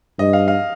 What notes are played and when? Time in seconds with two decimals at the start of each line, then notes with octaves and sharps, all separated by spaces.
0.19 G2 D#5
0.33 F5
0.48 F5